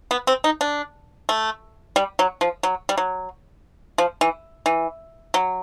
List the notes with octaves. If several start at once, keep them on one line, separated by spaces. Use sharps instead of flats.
B3
C4
D#4
D4
A3
G3
F#3
F3
F#3
G3
F#3
F3
E3
E3
F#3